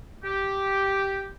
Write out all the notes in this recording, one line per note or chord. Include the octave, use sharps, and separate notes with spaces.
G4